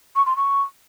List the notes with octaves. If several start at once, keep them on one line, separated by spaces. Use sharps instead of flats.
C#6
C6
C#6